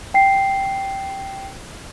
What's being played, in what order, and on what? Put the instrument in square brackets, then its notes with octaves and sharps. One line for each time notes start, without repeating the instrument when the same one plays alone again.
[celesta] G5 C7